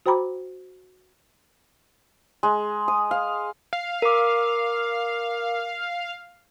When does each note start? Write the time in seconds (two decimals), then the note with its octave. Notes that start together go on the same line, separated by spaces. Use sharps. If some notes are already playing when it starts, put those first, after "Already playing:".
0.06 F#4 C5 G5 A#5 B5 D6
2.43 G#3
2.88 D#6
3.11 F5
3.73 F5
4.02 A#4 D6